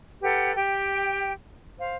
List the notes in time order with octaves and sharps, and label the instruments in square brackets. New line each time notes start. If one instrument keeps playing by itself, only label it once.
[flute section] G4 A4 B4 F#5
G4 G5
C5 F5